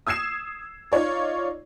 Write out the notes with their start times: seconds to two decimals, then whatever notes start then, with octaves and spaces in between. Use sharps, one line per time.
0.07 D#6 E6 G#6 C7 E7
0.92 D#4 F4 C#5 D5